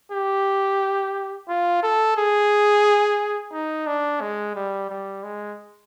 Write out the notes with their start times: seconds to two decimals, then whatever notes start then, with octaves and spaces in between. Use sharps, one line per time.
0.12 G4
1.48 F4
1.83 A4
2.17 G#4
3.53 D#4
3.87 D4
4.21 G#3
4.55 G3
4.89 G3
5.23 G#3